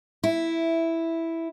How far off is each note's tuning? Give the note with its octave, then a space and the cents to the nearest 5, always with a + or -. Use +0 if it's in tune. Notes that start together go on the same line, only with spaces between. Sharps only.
E4 +0